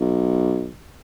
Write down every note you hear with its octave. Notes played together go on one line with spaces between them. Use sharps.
B1